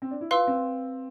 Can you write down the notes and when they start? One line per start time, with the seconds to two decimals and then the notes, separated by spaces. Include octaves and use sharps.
0.02 C4
0.11 D4
0.21 E4
0.31 F4 B4 F5 C6 E6
0.47 C4